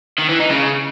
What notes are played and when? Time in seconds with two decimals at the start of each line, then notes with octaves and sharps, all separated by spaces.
0.19 D#3
0.29 E3
0.40 D#4
0.50 C#3